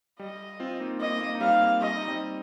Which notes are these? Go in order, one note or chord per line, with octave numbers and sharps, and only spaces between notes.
G3 D#5
C4 F4
A#3 D#4
A#3 D#4 D#5
A#3
D#4
G3 C4 F5
A#3
G3 D#5
D#4
G3 C4